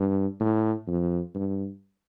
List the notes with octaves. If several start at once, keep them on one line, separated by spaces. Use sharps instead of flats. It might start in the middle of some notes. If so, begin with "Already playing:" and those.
Already playing: G2
A2
F2
G2